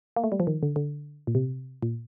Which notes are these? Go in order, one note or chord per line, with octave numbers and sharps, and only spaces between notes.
A#3
A3
G3
F3
D#3
D3
D3
A#2
C3
A#2